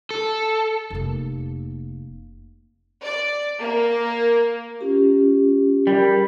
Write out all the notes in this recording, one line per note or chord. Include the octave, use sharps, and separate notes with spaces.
A4
F1 A#3
D5
A#3
C#4 F4 G4
G3 A#4
G#4